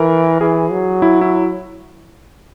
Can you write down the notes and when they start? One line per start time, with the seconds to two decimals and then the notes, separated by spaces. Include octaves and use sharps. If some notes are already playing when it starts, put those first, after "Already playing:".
Already playing: E3 A#4
0.41 E3 G#4
0.71 F#3
1.02 E4
1.21 E4